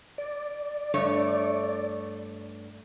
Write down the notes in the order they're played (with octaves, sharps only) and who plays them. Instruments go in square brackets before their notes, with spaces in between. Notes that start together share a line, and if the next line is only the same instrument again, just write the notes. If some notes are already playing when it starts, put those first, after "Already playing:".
[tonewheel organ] D5
[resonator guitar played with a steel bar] G2 A3 C#5